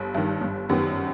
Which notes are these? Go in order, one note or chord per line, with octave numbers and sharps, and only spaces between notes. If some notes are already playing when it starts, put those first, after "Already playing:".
Already playing: G1
G2 D#3
G1
F#2 D#3 G3 B3